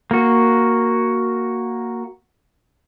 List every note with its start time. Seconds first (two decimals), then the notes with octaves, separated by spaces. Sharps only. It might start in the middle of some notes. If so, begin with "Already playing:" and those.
0.11 A#3 F#4